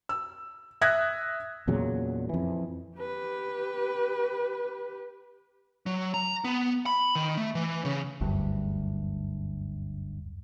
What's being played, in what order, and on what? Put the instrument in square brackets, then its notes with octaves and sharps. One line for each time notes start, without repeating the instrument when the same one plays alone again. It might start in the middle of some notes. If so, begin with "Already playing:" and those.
[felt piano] E6
E5 D#6 F#6 G#6 A#6
[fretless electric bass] E2 A#2 C#3 F#3
F2 E3
[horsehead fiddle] G4 B4
[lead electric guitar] F#3
A#5
B3
B5
D#3
A3
E3
C#3
[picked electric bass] F#1 D2 G2